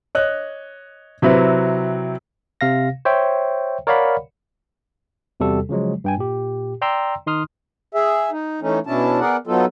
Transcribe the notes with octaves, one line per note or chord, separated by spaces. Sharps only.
C#5 D#5 F#6
C3 F#3 C4 E4 B4
C3 F5 A#6
C5 C#5 E5 G5
A#4 C#5 D5 F5 F#5 B5
E2 C3 G3 F#4 A4
C#3 F3 F#3 G#3
G2 G5 G#5
A#2 G4
D5 G5 A#5 C6 E6
D#3 D#4 C6 D#6 F6
G#4 E5
D#4
E3 A3 C#4 D#4
B2 C#4 D4 E4 A5
B3 G#4 A#4 D5 F#5
F#3 B3 D#4 F4 A4